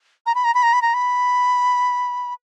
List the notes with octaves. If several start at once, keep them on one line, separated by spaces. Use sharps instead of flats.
A#5
B5
A#5
B5
A#5
B5
A#5
B5